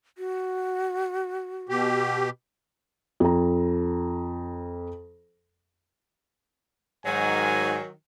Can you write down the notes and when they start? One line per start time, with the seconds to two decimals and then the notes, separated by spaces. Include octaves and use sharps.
0.18 F#4
1.69 B2 G4
3.20 F2 A#5
7.06 G#2 D#3 F#3 G#5